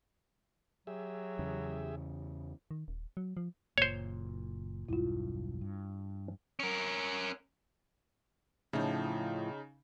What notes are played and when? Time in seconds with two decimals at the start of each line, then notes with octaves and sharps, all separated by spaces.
0.87 F#3 G4 G#4 E5
1.39 E2 C#3
2.71 D#3
2.88 D#1
3.17 F#3
3.37 F3
3.78 F#1 A#2 C5 C#5
4.89 E1 B1 G2 E4 F4
5.61 G2
6.60 C#4 A#4
8.73 A2 C#3 F3 D#4